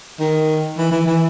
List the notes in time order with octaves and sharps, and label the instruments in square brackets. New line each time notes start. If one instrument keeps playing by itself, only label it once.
[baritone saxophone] D#3
E3
E3
E3